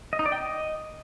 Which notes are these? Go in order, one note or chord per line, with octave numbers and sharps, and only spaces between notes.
D#5
D#4
D5
G5
D#5